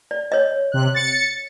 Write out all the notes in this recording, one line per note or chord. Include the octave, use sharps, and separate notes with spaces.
D5
C#5 D#5
C3 F#6
A6 C#7